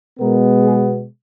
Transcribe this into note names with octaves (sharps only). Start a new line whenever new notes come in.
B2 G#3 B3 A#4
G#4